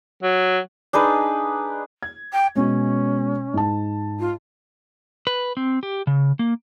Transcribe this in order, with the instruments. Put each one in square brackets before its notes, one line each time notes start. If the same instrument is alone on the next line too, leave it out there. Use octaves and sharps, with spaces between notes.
[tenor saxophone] F#3
[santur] D4 D#4 G#4 B4
[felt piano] G#6
[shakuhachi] G5
[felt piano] B2 G#3 [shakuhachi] C#4
[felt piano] G#2 A5
[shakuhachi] F4
[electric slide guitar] B4
C4
G4
C#3
A#3